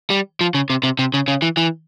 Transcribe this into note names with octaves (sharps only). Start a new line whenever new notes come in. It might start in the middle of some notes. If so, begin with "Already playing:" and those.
G3
F3
C#3
C3
C3
C3
C#3
C#3
E3
E3